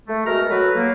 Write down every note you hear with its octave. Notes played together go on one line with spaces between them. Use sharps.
A3
B2 G#3 F#4 A#4 A#5
F#3 F#4 A4 B4
F#3 A#3